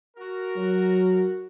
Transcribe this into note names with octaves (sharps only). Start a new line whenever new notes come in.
F#4 A#4
F#3